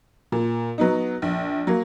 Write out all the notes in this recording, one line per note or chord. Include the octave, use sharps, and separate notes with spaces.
A#2
F#3 B3 D#4
A#1
F#3 A#3